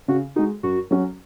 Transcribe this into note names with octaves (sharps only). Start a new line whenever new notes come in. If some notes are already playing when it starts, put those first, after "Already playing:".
C#3 F#4
G#3 D#4 F#4
F#2 F#4
F#3 C#4 F#4